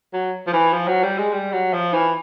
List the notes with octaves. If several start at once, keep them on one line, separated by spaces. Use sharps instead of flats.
F#3
F3
E3
F3
F#3
G3
G#3
G3
F#3
F3
E3